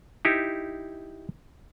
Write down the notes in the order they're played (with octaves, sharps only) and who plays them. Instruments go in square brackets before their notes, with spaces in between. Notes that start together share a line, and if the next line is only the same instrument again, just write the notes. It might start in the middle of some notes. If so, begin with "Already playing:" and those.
[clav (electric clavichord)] D#4 E4 G4